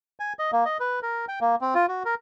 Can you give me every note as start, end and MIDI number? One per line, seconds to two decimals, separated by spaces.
0.20 0.33 80
0.39 0.51 75
0.52 0.64 58
0.65 0.78 75
0.80 1.00 71
1.02 1.25 70
1.28 1.39 79
1.41 1.55 58
1.61 1.74 60
1.75 1.86 65
1.88 2.03 66
2.05 2.15 70